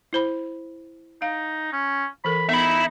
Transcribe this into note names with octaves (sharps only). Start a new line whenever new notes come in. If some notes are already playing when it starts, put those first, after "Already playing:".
E4 C5 B5
D#4 F5
C#4
E3 A4 A#4 B5
B3 D#4 E5 B5